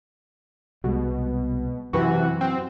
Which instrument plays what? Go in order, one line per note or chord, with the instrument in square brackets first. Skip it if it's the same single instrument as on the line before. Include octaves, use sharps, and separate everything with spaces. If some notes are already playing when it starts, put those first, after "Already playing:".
[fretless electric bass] C2 G3 G#3 [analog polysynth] B2
[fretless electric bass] F#2 [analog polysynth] C3 E3 F#4
[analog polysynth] C4